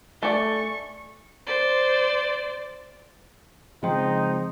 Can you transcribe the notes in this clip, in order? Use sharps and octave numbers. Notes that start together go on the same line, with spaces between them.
A3 A4 D5 G#5 C#6
C5 D5
C#3 F3 G#3 C4 D#4 G5 C6